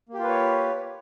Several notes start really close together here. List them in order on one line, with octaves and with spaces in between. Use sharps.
A#3 G4 F4 B4 C#5